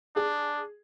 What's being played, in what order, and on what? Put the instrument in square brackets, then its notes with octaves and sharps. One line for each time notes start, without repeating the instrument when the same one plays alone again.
[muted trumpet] D4 [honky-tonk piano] G#4